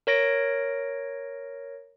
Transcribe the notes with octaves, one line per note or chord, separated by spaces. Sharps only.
A#4 C#5 A#6 D7